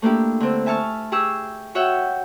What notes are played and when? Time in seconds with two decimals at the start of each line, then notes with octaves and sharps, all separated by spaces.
0.02 A3 A#3 D4 E4 G4
0.40 D3 C4
0.66 E5 G#5 A5 C#6 F6
1.12 G4 G#4 C#6 E6
1.75 F#4 C#5 E5 F#5 G5